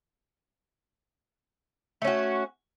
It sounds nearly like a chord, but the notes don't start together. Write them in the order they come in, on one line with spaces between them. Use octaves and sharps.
A3 C#4 F#4